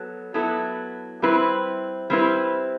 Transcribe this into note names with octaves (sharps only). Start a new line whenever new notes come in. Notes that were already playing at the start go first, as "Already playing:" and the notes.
Already playing: F#3 B3 A4
F#3 B3 E4 A4
G3 C4 E4 B4
G3 C4 E4 B4